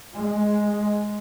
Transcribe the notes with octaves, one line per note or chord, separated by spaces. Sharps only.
G#3